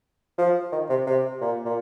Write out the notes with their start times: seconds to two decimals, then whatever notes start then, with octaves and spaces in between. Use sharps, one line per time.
0.38 F3
0.72 D#3
0.89 C3
1.06 C3
1.41 A#2
1.65 A#2